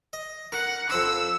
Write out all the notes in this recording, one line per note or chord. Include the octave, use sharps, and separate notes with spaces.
D#5
A#4 F#5
F2 C5 B5 E6